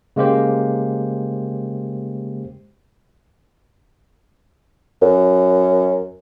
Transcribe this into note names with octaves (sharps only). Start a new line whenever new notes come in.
C#3 G#3 A#3 G4 C5
F#2